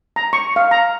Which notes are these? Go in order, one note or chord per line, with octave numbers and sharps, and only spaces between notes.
A#5
C#6
F5
A#5